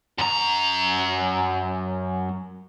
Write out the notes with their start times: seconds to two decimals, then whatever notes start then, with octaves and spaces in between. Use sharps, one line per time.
0.18 F#2 A#5